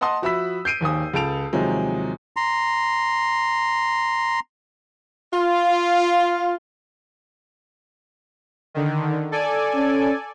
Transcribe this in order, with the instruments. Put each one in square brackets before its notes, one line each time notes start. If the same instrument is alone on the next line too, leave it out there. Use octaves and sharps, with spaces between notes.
[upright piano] D#5 F#5 A5 C6 D#6
F3 F#4 E5 B5 E6 B6
G6 C7 D7 D#7
G#1 D#2 G#5 D#6
C#2 A4 A5 D7 F7
D#2 C3 F3 F#3 G#3
[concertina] A#5 C6
[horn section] F4
[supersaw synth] D3 D#3
A4 D5 G#5
[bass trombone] C#4